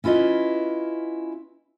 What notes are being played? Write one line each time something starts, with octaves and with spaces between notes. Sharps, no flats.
C#4 E4 F4 B4 D#5